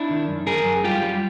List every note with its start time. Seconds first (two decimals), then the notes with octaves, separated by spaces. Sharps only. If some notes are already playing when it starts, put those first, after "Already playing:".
Already playing: D4 E4
0.10 D#3
0.28 F#2
0.47 F#2 G#4 A#4
0.65 F#2
0.84 G3 F4 G4
1.03 G3